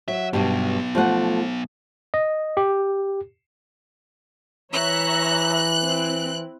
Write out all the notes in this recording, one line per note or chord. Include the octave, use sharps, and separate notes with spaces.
F#3 E5
G2 B2 F#3 B3
F3 A3 F#5
D#5
G4
E3 C#5 E5 A#5 F#6
C4 E4